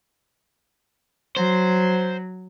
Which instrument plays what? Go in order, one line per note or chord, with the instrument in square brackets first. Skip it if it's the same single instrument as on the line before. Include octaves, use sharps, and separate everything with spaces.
[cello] F#3 [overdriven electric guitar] C5